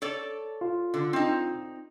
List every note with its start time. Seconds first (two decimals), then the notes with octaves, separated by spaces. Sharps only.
0.02 A4 C#5 D5
0.61 F4
0.94 D3
1.13 C4 D#4